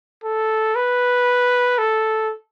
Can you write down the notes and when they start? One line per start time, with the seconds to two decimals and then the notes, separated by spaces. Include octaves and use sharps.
0.24 A4
0.76 B4
1.78 A4